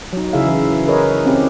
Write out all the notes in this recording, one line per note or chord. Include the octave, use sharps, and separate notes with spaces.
F#3 D#4
C#3 E4 G#4 E5 F5
E3
G#4 A#4 B4 C#5 D#5
C4 C#4 E4 G4